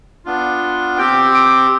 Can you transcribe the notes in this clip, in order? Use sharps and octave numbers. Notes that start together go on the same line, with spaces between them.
B3 D4 F4
C4 G4 G5
G5